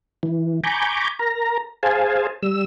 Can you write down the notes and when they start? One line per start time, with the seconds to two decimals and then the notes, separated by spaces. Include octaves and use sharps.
0.23 E3
0.64 G#5 A#5 B5 C#6 D6 G6
1.19 A#4 A#5
1.83 G#4 C5 F5 G#5 A5
2.43 G3 E6